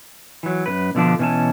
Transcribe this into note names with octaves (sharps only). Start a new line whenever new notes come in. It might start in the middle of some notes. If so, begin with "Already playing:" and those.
E3 F#3
F#2 C3 B4
B2 D3 F3 D4
B2 E3 C#4 G#5 A5